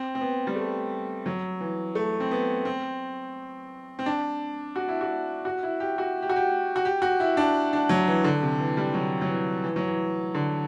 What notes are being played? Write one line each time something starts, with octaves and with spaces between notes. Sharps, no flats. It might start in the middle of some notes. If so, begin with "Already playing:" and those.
Already playing: C4
C4
B3
G3
A3
F#3
E3
A3
C4
B3
C4
C4
D4
F#4
E4
F#4
F#4
E4
G4
F#4
G4
F#4
G4
F#4
G4
F#4
E4
D4
D4
F#3
E3
D3
C3
E3
G3
F#3
F#3
E3
E3
F#3
E3
D3